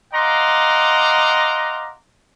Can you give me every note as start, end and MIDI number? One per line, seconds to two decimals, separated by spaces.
0.13 1.93 75
0.13 1.93 77
0.13 1.93 78
0.13 1.93 82
0.13 1.93 84
0.13 1.93 86